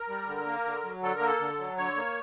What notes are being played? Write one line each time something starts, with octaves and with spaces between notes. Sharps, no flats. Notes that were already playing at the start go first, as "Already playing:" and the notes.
Already playing: A#4
G3
D3
A#3
D3
F#3
D3 A4
A#4
A#3
A4
D3
F#3
D3 C#5
A#3